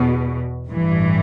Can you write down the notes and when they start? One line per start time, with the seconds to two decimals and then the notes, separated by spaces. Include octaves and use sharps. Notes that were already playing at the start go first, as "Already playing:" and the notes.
Already playing: E2 B2
0.68 A1 G2 E3